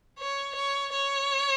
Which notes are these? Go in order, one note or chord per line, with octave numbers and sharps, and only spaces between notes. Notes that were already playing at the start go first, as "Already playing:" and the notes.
C#5
C#5
C#5